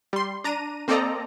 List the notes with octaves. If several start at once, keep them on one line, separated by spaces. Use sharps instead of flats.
G3 C6
D4 A#5 D#7
A#3 C4 A4 D5 D#5 A#5